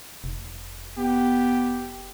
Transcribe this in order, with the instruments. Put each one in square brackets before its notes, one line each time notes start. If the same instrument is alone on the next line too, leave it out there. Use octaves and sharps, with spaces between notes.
[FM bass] F1
[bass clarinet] B3 [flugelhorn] G4